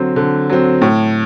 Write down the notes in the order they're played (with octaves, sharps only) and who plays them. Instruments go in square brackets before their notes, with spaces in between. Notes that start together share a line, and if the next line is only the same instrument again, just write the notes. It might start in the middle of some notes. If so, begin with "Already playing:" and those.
Already playing: [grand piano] D3 F#3 C4
D3
F#3 C4
A2